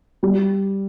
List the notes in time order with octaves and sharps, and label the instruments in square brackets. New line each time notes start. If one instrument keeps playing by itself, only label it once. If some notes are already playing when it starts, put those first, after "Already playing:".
[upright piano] G3